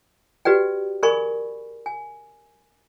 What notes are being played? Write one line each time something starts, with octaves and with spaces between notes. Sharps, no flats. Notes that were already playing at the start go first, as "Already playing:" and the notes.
F#4 G4 B4 D5 G5
G#4 A#4 D5 G#5 B5 C#6
G#5